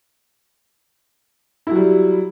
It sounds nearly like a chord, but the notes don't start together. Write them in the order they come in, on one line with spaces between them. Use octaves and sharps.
E4 F#3 G3